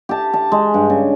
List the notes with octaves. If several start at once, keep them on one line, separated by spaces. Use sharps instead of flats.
G4 A5
A5
G#3
G2
C#3